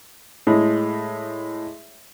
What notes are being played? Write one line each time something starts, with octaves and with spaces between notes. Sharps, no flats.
A2 G#3